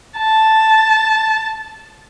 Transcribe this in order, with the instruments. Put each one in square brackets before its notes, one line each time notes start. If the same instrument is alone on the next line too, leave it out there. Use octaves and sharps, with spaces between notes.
[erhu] A5